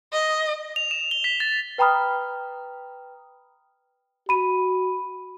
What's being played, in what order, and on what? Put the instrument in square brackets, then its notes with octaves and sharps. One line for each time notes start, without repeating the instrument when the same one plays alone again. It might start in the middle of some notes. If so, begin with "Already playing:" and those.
[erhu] D#5
[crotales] F7
E7
G7
B6
A6
[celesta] B4 G5 A#5 B5 D#6 F6
[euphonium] F#4 [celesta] B5 D#7